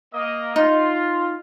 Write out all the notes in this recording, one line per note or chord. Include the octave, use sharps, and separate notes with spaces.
A#3 D#5
D#4 F4